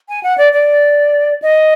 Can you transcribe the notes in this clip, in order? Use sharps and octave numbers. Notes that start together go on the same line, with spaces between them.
G#5
F#5
D5
D5
D#5